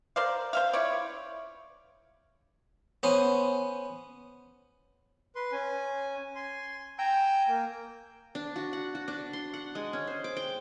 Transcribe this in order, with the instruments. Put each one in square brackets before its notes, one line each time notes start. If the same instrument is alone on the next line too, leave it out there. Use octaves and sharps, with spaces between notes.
[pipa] A#4 C5 D5 F5
C5 E5 F5
E4 F4 C#5 D5
[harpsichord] B3 C#4 C5
[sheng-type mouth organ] B4 C6
C#4 G#5
G#5 C6
[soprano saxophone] G5 [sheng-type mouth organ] G#5 A#5 E6
[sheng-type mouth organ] A#3
[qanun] D4
F#4
F#5
F#4
D4
C6
F#5
G#3
C#4
C5
D6
G5